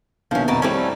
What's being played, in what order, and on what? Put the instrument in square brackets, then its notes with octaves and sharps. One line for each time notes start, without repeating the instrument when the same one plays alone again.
[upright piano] A#1 B2 D#3 [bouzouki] F3 C#4
[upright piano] F2 F#5 [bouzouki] B2 A#4 A5
[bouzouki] G3 A3 C#4 [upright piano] C4 E4